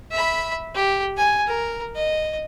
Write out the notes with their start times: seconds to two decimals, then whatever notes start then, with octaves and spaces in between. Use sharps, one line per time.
0.11 E5 B5
0.75 G4
1.17 G#5
1.47 A#4
1.95 D#5